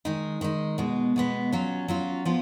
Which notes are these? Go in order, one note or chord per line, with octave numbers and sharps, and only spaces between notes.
D#3 G#3 D#4
D#3 G#3 D#4
B2 G#3 B3
B2 G#3 B3
F#3 C#4 F4
F#3 C#4 F4
F3 B3 F4